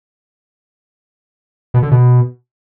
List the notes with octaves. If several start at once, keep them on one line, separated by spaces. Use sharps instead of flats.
B2
D3
B2